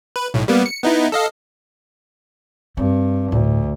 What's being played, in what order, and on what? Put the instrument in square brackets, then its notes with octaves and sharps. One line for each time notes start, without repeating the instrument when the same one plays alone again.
[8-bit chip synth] B4
B1 A2
G3 A#3 B3
C#7
B3 D#4 E4
A4 D#5 F5
[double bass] G2 [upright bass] C4
[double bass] D2 [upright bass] A2